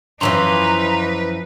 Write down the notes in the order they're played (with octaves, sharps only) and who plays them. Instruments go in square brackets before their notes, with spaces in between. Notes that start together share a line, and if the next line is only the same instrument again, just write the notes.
[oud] F#2 E3 F3 [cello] D#4 B4 [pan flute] A#5 [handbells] C6